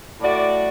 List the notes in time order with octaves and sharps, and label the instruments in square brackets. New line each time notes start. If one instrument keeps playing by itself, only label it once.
[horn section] A2 A3 F#4 D5